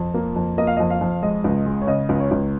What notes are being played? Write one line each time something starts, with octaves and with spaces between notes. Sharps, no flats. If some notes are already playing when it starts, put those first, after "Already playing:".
Already playing: F2
A#3
F2
A#3 D#5
F5
F2 D#5
F5
F2
G#3 D#5
C#2
G#3
C#5
C#3 D#5
C#2
C#5
C#2